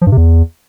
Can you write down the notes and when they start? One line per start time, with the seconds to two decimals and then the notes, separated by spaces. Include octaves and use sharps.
0.01 F3
0.07 G2
0.12 C3
0.17 E2